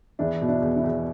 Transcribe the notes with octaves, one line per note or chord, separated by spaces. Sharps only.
E2 D4 E4
B2
D4 E4
E2
D4 E4
E2